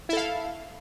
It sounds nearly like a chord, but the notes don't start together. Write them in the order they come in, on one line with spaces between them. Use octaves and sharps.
E4 A4 F5